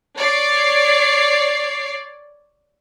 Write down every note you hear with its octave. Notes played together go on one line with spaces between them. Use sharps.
C#5 D5 C7